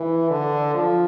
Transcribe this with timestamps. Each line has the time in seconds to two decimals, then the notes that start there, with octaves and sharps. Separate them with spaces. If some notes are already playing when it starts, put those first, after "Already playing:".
Already playing: E3
0.30 D3
0.74 F3